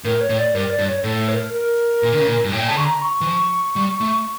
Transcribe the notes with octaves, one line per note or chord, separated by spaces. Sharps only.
A2 A#4
C#5
A2
D5
G2 A#4
D5
G2
C#5
A2 A4
C#5
A#4
A#4
A#2
D3
C#3
A#2
G2
A2 G5
A#2
C#3 A5
D3 C#6
A#5
C#6
E3
F3
G3
A3